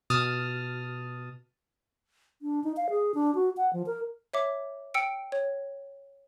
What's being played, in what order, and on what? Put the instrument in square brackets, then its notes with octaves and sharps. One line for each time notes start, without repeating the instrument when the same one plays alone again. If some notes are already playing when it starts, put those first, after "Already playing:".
[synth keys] B2 A5 D#6 F6
[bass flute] D4
D#4
F5
G#4
D4
F#4
F#5
F3
A#4
[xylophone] C#5 E5 D6
G5 E6 C#7 D7
C#5